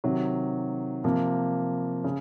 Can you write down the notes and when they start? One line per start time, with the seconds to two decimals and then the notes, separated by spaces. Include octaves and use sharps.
0.04 C3 D#3 F#3
1.04 C3 F3 A#3
2.04 C#3